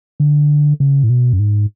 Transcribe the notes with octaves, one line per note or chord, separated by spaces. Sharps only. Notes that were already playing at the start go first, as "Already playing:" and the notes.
D3
C#3
A2
B2
F#2
G#2